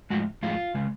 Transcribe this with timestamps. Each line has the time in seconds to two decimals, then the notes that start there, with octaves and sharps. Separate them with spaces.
0.10 A2 F3 G#3 F#4
0.43 A2 F3 G#3 F4
0.75 C#3 G#3